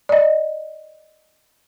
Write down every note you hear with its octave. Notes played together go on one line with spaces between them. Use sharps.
D5 D#5